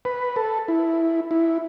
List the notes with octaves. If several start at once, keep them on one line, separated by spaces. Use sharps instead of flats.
B4
A4
E4
E4